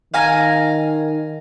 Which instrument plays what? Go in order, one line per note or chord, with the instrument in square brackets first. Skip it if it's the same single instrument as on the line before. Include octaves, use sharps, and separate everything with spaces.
[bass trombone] D#3 [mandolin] F5 G#5 A#5